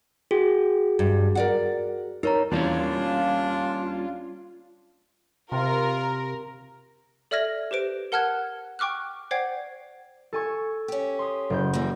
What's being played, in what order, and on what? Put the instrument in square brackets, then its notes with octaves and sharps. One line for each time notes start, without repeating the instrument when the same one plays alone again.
[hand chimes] F#4 G#4 G5
[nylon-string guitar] G2
A#4 D5 F#5
[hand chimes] D#4 C#5 A#5 [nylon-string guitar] A#4
[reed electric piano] E2 [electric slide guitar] G3 A#3 C#4 [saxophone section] D4 [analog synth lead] F4
[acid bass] C3 [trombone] F4 [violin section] A#4
[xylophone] A4 D5 E5 F6 G#6 A#6
G4 B4 C5 D7
A#4 F#5 A5 F6 F#6 G#6
G5 C#6 D6 F6 F#6
C5 D5 F#5 G5 G#6 C7
[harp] A4 G#5 C#6
[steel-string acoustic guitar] C#4 G4
[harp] C6 D#6
F#1 G6
[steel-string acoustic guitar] E3 G3 A#3